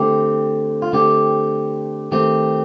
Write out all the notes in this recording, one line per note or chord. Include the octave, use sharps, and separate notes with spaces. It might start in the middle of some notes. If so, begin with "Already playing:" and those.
Already playing: D3 A3 C4 G4
F4
D3 A3 C4 G4
D#3 A3 C4 G4